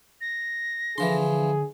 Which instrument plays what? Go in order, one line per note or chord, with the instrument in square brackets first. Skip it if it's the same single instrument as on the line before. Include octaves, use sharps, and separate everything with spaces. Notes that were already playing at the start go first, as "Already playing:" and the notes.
[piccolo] A#6
[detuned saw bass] D3 [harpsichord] E3 F3 C6 [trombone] G#4